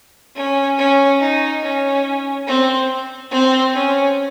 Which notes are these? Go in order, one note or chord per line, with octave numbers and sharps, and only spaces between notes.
C#4
C#4
D#4
C#4
C4
C4
C#4